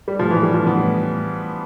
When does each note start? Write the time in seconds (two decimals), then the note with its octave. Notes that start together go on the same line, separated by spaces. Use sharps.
0.08 G3
0.19 A2 F3
0.30 A2 E3
0.43 G3
0.50 F3 A3
0.66 A2 B3
0.82 A2